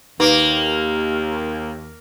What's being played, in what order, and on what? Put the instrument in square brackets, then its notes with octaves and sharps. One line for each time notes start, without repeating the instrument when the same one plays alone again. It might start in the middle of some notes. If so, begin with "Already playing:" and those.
[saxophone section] D#2 [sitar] A#3 [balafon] D#4 B4